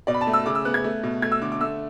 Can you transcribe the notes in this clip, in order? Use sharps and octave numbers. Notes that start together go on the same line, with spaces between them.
B2 D5
B5
A5
A3
E6
C#3 D6
E6
B3 F#6
G#6
A3
B2
A3 G#6
E6
D3 D6
D6
A3 E6